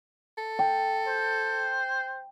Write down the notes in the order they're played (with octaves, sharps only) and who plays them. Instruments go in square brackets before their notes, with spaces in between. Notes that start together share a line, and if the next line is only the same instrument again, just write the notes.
[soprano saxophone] A4
[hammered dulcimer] G5
[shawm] C5